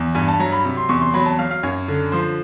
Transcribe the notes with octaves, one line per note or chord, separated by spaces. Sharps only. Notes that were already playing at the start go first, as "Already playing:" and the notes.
Already playing: E2
G2 G#5
A5
F#3 A#5
B5
C3
C6
E2 C#6
C6
F#3 B5
A5
F#3 F5
F5
F#2 C#5
D3
F3 C5